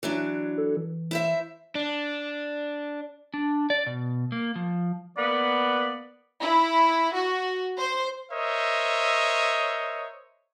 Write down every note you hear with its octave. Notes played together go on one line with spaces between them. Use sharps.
E3 F#3 D4
A4
E3
E4 C5 E5
D4
D4
D5
B2
A#3
F3
A#3 B3 D5
E4
F#4
C5
A#4 C5 C#5 D#5 E5